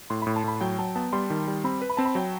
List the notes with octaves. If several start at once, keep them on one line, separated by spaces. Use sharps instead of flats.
A2 C6
A2 B5
A5
A2 B5
F#3 G5
F#3 A5
B3 A5
G3 C6
D#3
G3
C4 B5
B4
B5
C4 A5
B5
F#3 G5